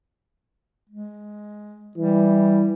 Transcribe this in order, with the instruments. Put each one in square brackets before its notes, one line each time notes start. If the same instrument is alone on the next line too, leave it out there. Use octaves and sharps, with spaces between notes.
[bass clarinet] G#3
[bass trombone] E3 [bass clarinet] G3